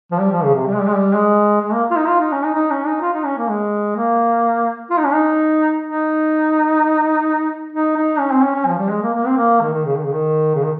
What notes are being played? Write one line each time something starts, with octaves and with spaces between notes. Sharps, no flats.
F3
G3
F3
C#3
C3
G3
G#3
G3
G#3
G3
G#3
G#3
A#3
F4
D#4
F4
D#4
C#4
D#4
D#4
C#4
D#4
F4
D#4
C#4
A#3
G#3
A#3
F4
D#4
C#4
D#4
D#4
D#4
D#4
C#4
C4
C#4
C#4
F3
G3
G#3
A#3
A#3
C4
A#3
D#3
D#3
C#3
D#3
C#3
D#3
C#3
D#3